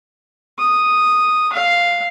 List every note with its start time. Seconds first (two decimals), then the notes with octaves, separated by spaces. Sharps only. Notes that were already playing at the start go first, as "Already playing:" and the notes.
0.59 D#6
1.53 F5